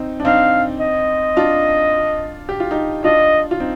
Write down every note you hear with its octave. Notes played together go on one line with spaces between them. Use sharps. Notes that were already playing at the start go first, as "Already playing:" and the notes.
Already playing: C4 D#4
D4
C4 D#4 F5
D#5
D4 F4
G4
F4
D#4 G4
D4 F4 D#5
F4
C4 D#4